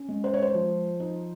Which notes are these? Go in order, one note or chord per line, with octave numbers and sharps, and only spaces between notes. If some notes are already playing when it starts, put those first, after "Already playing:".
Already playing: C#4
G#3
C5
C#5
C5
F3
D#4